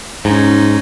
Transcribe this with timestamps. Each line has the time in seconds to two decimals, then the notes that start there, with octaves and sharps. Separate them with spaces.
0.25 G#2 C#4 D#4